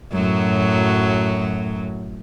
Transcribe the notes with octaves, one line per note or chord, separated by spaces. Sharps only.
F#2 A2 F#3